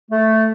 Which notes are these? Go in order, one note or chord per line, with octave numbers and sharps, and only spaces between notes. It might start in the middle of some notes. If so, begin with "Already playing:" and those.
A3